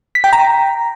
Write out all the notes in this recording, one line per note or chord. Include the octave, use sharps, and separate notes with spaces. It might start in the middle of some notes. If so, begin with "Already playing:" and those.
B6
G5
A#5